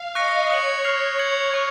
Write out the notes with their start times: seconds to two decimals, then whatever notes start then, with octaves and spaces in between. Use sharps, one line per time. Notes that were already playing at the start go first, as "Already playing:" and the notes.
Already playing: F5
0.15 D#5 C#6 F#6 A#6 C#7
0.49 C#5 D#6 F#6 C#7 F#7
0.84 F6 C7 F7
1.19 G#6 C#7 F#7
1.54 C#6 F#6